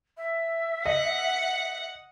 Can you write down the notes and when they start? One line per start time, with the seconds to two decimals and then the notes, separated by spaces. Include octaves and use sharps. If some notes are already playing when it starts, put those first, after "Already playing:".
0.17 E5
0.85 D#5 F#5